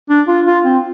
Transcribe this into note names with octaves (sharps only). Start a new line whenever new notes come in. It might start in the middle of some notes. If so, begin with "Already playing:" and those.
D4
F4
F4
C4